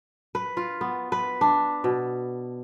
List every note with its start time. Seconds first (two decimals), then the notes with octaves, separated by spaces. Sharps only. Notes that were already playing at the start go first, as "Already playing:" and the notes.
0.35 B4
0.57 F4
0.81 B3
1.12 B4
1.41 D4
1.84 B2